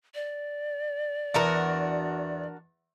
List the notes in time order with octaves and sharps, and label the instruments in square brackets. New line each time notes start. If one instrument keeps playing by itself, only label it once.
[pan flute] D5
[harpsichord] E2 [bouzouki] D4 F#4 A#4